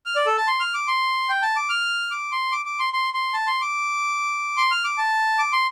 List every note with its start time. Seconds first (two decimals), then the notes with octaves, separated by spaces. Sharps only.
0.06 F6
0.16 D5
0.26 A4
0.37 A5
0.47 C6
0.60 F6
0.74 D6
0.88 C6
1.29 G5
1.42 A5
1.56 D6
1.70 F6
2.11 D6
2.32 C6
2.52 D6
2.66 D6
2.79 C6
2.93 C6
3.14 C6
3.34 A5
3.47 C6
3.62 D6
4.57 C6
4.71 F6
4.85 D6
4.98 A5
5.39 D6
5.53 C6